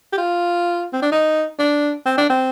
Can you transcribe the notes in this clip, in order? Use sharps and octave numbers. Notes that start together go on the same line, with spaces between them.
G4
F4
C4
D4
D#4
D4
C4
D4
C4